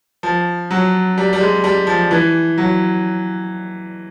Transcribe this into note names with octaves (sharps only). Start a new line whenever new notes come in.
F3
F#3
G3
G3
G#3
G3
F3
E3
F#3